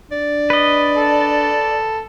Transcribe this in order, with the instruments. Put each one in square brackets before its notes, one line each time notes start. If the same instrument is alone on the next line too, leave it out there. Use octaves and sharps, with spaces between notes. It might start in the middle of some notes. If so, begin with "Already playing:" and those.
[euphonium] D4 [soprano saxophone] D5
[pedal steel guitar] B4 D#5
[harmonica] A4